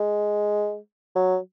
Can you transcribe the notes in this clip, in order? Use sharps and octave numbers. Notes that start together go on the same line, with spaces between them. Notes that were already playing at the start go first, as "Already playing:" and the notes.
Already playing: G#3
F#3